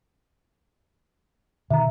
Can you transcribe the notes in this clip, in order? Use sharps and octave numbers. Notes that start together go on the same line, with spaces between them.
B2 D3 D#3 E5 A#5